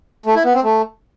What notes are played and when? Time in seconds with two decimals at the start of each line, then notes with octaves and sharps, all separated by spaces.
0.26 A3
0.35 E4
0.45 B3
0.54 C4
0.64 A3